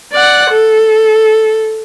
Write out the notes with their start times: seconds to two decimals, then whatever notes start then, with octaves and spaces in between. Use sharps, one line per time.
0.12 D5 F#5
0.50 A4